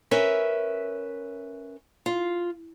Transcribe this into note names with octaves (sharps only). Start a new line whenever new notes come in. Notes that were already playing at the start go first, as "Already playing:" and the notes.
C#4 A#4 B4 E5
F4